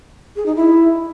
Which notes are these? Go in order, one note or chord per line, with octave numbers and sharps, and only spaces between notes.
G#4
D#4
E4